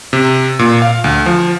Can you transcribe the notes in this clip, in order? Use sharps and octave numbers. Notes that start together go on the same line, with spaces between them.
C3
A#2
F5
D2
F3